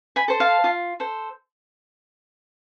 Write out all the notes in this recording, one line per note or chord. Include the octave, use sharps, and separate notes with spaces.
G#5 B5
A4 C5
F5 A5
F4
A4 C5